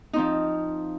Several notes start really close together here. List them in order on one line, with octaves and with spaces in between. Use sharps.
D#4 C4 F3